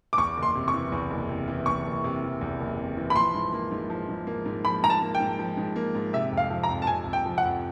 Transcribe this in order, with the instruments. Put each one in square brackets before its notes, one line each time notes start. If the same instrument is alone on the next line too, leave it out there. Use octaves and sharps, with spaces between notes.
[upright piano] D6
[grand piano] E2 [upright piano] C#6
[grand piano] F#1
[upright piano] C6
[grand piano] C3
[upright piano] C#6
[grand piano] E3
E2
F#1
C3
E3
[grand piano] E2 [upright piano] C#6
[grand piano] F#1
C3
E3
E2
F#1
C3
E3
[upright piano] B5
[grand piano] F3 [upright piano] C6
[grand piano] G#2
A#3
G#2
F3
G#2
A#3
G#2
[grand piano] F3 [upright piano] B5
[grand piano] G#2 [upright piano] A#5
[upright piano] A5
[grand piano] A#3
[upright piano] G5
[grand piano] G#2
F3
G#2
A#3
G#2
[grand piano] C3 [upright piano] E5
[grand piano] F2
[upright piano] F5
[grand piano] F3
[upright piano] A#5
[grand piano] F2
[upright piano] A5
[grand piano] C3 [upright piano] G#5
[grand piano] F2
[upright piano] G5
[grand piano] F3
[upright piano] F#5
[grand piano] F2